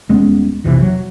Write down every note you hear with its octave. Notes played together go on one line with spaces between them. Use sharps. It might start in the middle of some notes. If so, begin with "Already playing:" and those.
D#1 G#3 B3 C#4
A#1 F2 C3 E3
F#3